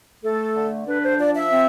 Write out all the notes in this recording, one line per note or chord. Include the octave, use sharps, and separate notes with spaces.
A3 A4
D3
D4 B4
C5
F3 D5
E5
C4